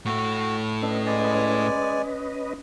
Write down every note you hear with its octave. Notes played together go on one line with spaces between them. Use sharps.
A2 A3 F#4
C#4 D4 A4 B4 D#5
G#3 D5 G#5